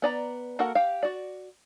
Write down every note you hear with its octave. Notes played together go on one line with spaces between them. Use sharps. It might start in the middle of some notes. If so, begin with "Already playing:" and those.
B3 D5 A#5
A#3 F#4 A4 A#4 F#5
G4 F5
F#4 D5